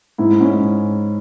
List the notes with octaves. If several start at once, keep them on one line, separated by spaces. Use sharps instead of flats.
G#2 E4
G#2 C#4